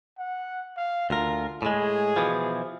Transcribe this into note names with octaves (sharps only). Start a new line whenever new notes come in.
F#5
F5
D2 F4 A#4
A2 G#3 G#4
B2 E3 F3